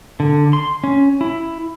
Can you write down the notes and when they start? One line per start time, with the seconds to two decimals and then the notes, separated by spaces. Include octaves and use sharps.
0.20 D3
0.53 C6
0.84 C#4
1.21 E4